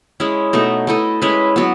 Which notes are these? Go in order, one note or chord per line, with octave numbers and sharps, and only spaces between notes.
G#3 C#4 E4
B2 A3 D#4
A3 E4 A4 D#5
G#3 C#4 E4 B4
F#3 B3